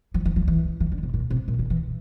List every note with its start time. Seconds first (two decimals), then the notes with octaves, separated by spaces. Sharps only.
0.14 F3
0.25 E3
0.36 F3
0.48 E3
0.80 E3
0.92 D3
1.03 C3
1.14 A#2
1.30 C3
1.48 A#2
1.59 D3
1.70 E3